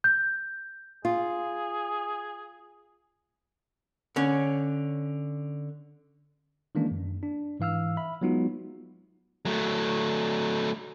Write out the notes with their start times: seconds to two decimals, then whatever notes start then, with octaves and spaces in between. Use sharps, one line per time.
0.04 G6
1.05 F4 G#4
4.16 D3 C#4
6.75 D#3 E3 G#3 A#3 C#4 D4
6.91 F#2
7.23 D4
7.60 G#2 E3 F5 E6 F6
7.97 E5 B5
8.21 F#3 G#3 B3 D#4 F4 F#4
9.45 F#3 A3